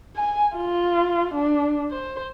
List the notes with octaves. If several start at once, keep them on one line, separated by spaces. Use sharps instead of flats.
G#5
F4
D4
C5